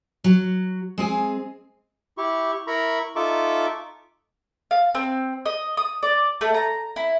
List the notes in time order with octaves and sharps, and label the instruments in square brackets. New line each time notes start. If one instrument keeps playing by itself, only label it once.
[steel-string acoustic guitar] F#3
G#3 C4 G#4 G#5
[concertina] E4 G4 C#6
E4 A#4 A#5 B5 C#6
D#4 F4 A4 E5 C#6 D6
[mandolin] F5
C4
D#5
D#6
D5
A3
A#5
E4